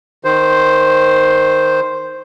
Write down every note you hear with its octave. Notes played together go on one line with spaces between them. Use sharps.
D#3 C5